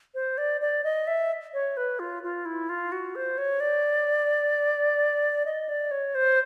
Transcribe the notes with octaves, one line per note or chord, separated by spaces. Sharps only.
C5
D5
D5
D#5
E5
C#5
B4
F4
F4
E4
F4
F#4
C5
C#5
D5
D#5
D5
C#5
C5